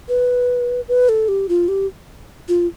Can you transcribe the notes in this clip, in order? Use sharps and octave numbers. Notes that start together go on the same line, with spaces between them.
B4
B4
A4
G4
F4
G4
F4